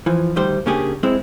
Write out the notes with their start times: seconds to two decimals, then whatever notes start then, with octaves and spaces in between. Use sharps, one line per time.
0.06 E3 F3
0.36 D2 D#3 G3 C5
0.66 C#3 A#3 C#4 D4 G4 G#4
1.03 G#3 C4 E4